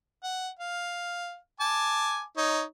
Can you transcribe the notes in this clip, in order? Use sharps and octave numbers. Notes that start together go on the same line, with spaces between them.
F#5
F5
G#5 A5 D6
D#4 C#5